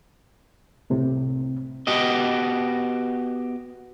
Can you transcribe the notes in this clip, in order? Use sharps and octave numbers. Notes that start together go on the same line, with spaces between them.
C2 A2 C3
B3 F#4 G4 D#5